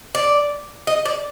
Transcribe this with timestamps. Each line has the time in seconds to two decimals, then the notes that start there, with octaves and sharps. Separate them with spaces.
0.15 D5
0.87 D#5
1.05 D5